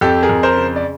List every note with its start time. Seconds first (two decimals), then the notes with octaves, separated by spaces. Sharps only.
0.01 F2 G4 A4
0.23 G#4 A#4
0.29 F2
0.43 A#4 C5
0.57 C#3
0.76 D5